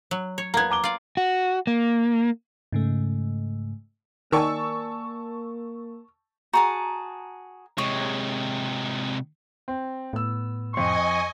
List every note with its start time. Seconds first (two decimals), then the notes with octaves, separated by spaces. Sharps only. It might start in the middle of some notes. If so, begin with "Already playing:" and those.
0.11 F#3
0.38 C#5
0.54 A#3 B3 A#5 G#6
0.70 A#5 D6 G7
0.84 F4 D5
1.17 F#4
1.67 A#3
2.72 G#2 C#3 A3
4.32 D#3 A#3 A#4 D5 G#5 A5 C#6 E6
6.53 F#4 G#4 A5 A#5
7.78 C3 G#3 C#5 D#5
9.68 C4
10.13 A2 B3 E6
10.74 F2 D#5 G#5 C6 C#6